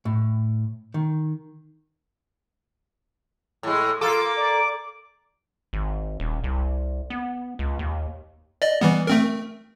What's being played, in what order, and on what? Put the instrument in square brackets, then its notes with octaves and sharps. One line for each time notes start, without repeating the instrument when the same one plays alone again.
[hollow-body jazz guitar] A2
D#3
[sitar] A2 G#3
[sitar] A#3 A4 [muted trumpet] F4 [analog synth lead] D6
[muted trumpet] D5
[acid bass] G#1
D#1
C2
B3
C#2
D#2
[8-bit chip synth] D5 D#5
E3 G3 B3
A3 C4 A#4